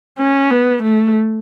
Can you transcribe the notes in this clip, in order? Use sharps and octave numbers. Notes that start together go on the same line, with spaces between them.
C#4
B3
A3